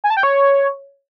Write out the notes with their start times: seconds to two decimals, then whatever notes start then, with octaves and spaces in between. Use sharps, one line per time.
0.04 G#5
0.10 A5
0.17 G5
0.23 C#5